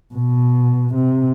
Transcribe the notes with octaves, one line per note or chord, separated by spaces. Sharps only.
B2
C3